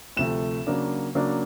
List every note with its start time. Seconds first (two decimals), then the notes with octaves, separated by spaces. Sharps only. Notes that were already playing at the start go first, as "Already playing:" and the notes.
0.16 D2 C3 F3 A3 E7
0.67 C#3 F#3 A#3 D4
1.15 C#3 F#3 A#3 D4